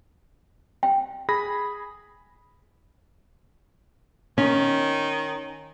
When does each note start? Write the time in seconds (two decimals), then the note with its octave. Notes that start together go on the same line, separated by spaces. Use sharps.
0.83 G5
1.29 G#4 B5 A#6
4.38 D#3 C#4